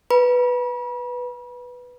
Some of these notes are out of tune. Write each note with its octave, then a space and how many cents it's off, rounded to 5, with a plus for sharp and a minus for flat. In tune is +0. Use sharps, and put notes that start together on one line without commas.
B4 +0 B5 -40